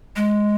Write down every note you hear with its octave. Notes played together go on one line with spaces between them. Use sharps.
G#3